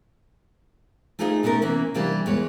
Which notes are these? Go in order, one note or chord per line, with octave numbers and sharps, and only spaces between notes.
A3 D#4 F4 G#4 D5 D#5
B2 A3 C#4 D#4 A#4
C3 E3 A#3 B3 C#4
C3 E3 G3 A#3 D4 G4
E2 G#3 C#5